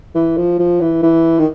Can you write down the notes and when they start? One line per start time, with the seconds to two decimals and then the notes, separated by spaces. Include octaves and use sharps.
0.15 E3
0.37 F3
0.59 F3
0.81 E3
1.02 E3
1.39 D#3